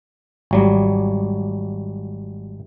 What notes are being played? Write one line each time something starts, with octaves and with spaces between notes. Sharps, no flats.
G#1 F#3 G3